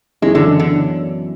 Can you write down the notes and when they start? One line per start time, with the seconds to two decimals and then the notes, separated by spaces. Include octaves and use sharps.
0.22 F#2 E3 G#3 B3 E4
0.35 D3
0.60 D3